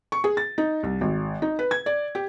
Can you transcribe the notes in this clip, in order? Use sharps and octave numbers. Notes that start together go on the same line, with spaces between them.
C#6
G#4
A6
D#4
C2
G#1
D#4
B4
G#6
D5
G4